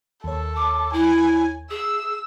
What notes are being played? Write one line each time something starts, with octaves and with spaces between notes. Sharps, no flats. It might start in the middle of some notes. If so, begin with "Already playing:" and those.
D#2 A4 C#5
D6
E4 G#5
G#4 E6